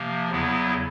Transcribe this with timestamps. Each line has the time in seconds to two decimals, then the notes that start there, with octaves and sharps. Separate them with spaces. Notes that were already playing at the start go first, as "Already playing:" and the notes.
Already playing: C3 F3 A#3
0.30 E2 C#3 F#3 B3 E4